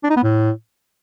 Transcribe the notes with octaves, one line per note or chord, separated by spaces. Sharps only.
D4
D#4
B3
A2